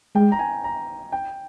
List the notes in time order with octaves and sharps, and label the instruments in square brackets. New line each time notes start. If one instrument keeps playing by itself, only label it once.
[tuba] G#3 [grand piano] G5
[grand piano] A#5
G#5
A#5
G5